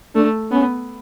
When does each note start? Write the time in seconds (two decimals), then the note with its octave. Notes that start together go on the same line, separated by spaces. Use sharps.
0.15 A3 D4
0.51 B3 C#4